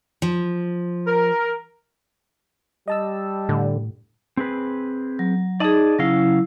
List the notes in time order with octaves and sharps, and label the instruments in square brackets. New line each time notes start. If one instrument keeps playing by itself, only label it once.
[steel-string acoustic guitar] F3
[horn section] A#4
[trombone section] G3 [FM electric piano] D#5 A5 E6
[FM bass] A2 [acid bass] D3
[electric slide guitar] C4 G#4 B4
[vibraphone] F#3
[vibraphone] D#4 G#4 [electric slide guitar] D5 D#5 A5
[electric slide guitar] C#3 C#4 F5 [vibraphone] F#3 E4